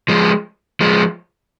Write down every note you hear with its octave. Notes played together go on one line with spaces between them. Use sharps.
F3 G#3
F3 G#3